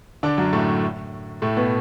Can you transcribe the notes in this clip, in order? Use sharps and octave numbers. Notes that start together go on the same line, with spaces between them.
D3 D4
F#2 F#3
A2 A3
A2 A3
B2 B3